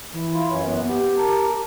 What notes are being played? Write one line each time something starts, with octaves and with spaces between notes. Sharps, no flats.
E3
E4 F4
F#2 E3 C#5
B3
B3 G4
A#4 A5 A#5